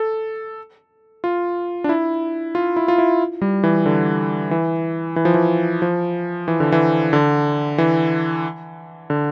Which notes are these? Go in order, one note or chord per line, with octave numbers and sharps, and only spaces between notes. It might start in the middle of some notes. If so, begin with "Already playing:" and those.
Already playing: A4
F4
D4
E4
F4
E4
F4
E4
G3
E3
D3
E3
E3
F3
E3
F3
E3
D3
E3
D3
E3
D3